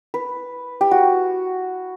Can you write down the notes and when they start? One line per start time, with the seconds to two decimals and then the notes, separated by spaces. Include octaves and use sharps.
0.14 B4
0.81 G4
0.91 F#4